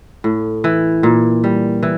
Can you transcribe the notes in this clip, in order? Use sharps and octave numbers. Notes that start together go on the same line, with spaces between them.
A2
E3
A#2
G3
E3